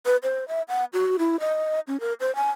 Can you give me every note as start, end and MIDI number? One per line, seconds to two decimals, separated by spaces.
0.06 0.17 71
0.23 0.47 72
0.48 0.62 76
0.68 0.84 78
0.93 1.17 66
1.19 1.40 64
1.40 1.80 75
1.88 2.00 61
2.00 2.13 70
2.20 2.34 72
2.36 2.50 80